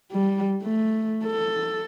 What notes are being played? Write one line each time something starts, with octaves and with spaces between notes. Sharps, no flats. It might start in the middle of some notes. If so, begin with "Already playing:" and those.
G3
A3
A4